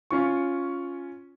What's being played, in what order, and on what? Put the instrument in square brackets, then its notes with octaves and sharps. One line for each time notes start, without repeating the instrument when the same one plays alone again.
[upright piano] C#4 F4 C#6